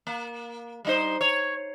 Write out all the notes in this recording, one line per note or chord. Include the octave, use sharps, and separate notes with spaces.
A#3
G3 D#4 C5
C#5